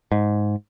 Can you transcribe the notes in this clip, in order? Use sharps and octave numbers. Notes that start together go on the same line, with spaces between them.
G#2